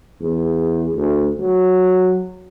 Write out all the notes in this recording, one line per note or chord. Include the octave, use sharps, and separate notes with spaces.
E2
D2
F#3